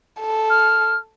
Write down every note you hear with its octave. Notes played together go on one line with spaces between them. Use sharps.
A4
F6